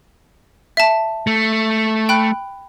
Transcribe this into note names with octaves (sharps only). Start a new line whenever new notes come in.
E5 A5
A3
G5 B5 F#6